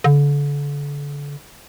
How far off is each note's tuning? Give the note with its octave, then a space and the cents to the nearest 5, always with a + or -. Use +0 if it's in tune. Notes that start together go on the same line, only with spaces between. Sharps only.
D3 -35